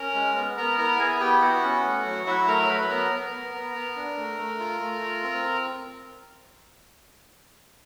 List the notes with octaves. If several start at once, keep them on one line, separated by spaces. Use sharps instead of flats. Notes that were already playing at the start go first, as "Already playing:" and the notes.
Already playing: C#4 A#4 A#5
G#3
B3
B3 A#4 A#5
E4 A#4 A#5
B3 G#4 G#5
E4 G4 G5
B3 F#4 F#5
C#4
A3
F#3
F#3 E4 E5
A3 A#4 A#5
F#3 B4 B5
B3 A#4 A#5
B3
B3
B3
B3
D4
A3
A3
F4
A3
F4
C4